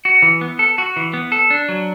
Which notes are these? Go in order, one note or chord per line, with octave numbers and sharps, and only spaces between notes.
F#4
E3
B3
A4
F#4
E3
B3
A4
D4
F#3